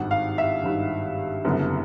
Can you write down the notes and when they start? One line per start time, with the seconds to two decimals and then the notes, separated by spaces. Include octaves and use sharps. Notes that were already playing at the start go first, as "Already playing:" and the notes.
Already playing: G#1 G2 D#3 F#5
0.11 F5
0.38 E5
0.64 G#1 G2 D#3
1.44 F#1 F#2 D3 G3 B3